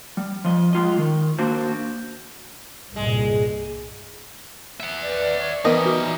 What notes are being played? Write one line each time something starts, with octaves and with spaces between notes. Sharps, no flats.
G3
F3 D#5
G#3 F4 D#5
D#3
A#3 D4 F#4 C5
C2 G2 A#2 G#3
E5 F#5
B4 D5
C#5
E3 G3 B3 D#4 A#4 C5 D#5 E5
F#4 D6 F6